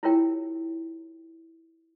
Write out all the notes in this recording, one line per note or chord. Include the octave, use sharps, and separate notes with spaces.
E4 F4 G4 A#4 C#5 G5